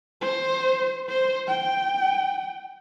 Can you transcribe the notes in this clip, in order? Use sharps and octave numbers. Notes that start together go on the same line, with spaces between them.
C5
C5
G5